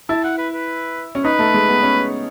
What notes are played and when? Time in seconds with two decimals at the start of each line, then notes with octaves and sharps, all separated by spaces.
0.09 E4 A5
0.24 F#5
0.38 B4
0.53 B4
1.15 C#4
1.25 D#4 B4
1.39 A3
1.54 G#3
1.69 B3
1.83 C#4